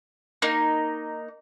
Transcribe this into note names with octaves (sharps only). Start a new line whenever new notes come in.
A#3 D#4